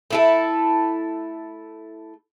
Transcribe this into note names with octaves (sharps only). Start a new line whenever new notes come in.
A3 E4 A4